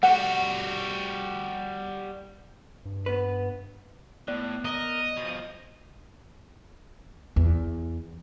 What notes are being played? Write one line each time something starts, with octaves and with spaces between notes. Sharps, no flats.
G3 F#4 F#5
G2
B3 B4
A2 B3 D5 F#6
A#4 D#5
B2 F3
E2